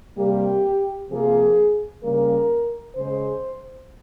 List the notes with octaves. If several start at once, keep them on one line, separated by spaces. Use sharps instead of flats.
C3 G3 A#3 G4
C3 F3 A#3 G#4
C#3 G3 A#3 A#4
C#3 G#3 C5